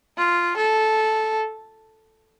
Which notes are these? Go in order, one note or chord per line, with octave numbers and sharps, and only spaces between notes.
F4
A4